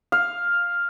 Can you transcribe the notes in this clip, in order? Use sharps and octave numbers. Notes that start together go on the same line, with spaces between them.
F5